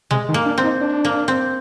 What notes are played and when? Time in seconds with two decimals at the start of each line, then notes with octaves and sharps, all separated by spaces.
0.11 C3 G#3
0.29 D#3
0.34 A#3
0.46 D4
0.58 C4
0.64 D#4
0.81 D4
1.05 A#3
1.28 C4